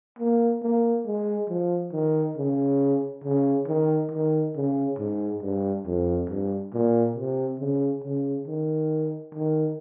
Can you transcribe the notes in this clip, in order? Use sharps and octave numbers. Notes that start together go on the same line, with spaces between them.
A#3
A#3
G#3
F3
D#3
C#3
C#3
D#3
D#3
C#3
G#2
G2
F2
G2
A#2
C3
C#3
C#3
D#3
D#3